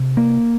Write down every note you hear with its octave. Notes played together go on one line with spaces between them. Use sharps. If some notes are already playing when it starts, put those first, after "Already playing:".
Already playing: C3
A#3